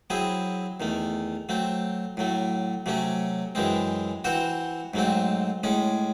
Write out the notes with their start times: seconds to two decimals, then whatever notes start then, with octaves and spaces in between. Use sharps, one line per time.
0.10 F#3 C4 E4 G#4
0.80 E2 D#3 A3
1.49 F#3 A3 C4
2.17 A2 F#3 A3
2.86 C3 F#3 A3 C#4
3.55 F#2 E3 G#3 C4
4.24 E3 C4 F#4 C5
4.94 G#2 F#3 A3 C4
5.64 A2 G#3 C#4